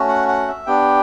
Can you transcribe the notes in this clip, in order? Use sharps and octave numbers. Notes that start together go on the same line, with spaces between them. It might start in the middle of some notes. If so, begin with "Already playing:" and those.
Already playing: A3 C#4 F#4
F#5
F#5
E5
B3 D4 G4 G5